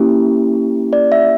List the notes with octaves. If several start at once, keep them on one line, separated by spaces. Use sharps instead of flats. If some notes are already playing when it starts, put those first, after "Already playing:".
Already playing: A#3 C#4 E4 G4
D5
E5